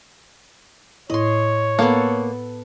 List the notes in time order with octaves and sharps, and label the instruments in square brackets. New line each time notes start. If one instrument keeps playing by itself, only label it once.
[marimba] A2 E4 [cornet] C#5 [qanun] D#5 C6
[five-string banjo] A#3 [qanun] B3 A4